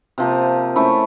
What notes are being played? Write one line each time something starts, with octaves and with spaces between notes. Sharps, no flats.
C3 F3 A#3
A3 C#4 E4